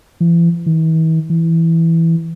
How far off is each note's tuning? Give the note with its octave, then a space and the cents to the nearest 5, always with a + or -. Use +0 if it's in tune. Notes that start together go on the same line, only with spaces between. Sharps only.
E3 +40
E3 -45
E3 +0